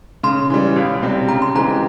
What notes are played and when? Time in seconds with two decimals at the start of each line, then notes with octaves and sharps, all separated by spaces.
0.23 C#3 C6
0.50 E3 G3
0.76 C#2
1.02 C3 G3 C4
1.29 C#3 A#5
1.42 C6
1.55 E3 G#3 C4 G4 A#5